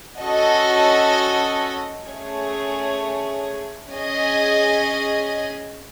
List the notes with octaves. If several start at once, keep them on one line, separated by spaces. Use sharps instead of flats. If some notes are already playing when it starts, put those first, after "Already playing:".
C#4 F#4 A4 D#5
A3 C#4 G#4 C#5
C#4 G#4 D#5 G#5